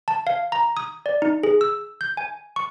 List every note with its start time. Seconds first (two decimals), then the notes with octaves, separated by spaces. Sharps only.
0.08 A5
0.27 F5
0.52 A#5
0.77 D#6
1.06 D5
1.22 D#4
1.43 G#4
1.61 E6
2.01 G6
2.17 G#5
2.56 C#6